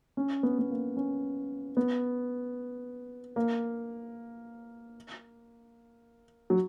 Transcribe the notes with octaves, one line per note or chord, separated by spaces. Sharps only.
C#4
B3
B3
A#3
C#4
B3
A#3
F#3